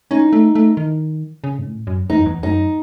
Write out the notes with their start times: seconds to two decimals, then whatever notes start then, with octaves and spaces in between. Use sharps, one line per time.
0.11 C#4 D#4
0.33 A3
0.55 A3
0.77 D#3
1.44 C#3
1.59 G#2
1.66 A2
1.87 F#2
2.10 E2 D#4
2.18 F#2
2.26 E2
2.43 F#2 D#4